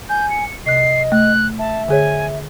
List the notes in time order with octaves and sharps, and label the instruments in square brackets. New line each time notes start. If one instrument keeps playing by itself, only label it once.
[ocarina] G#5 [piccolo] G6
[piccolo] C#7
[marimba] C3 F#6 [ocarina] D#5 [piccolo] C7
[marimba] A3 [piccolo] F#6
[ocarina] E5 [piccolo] A5
[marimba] D3 G#4 C#5 [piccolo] G#5